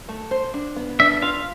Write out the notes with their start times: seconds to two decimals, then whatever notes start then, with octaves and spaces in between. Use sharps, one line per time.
0.09 A3
0.31 C5
0.54 D4
0.76 B3
1.00 D4 E5
1.22 F4 F5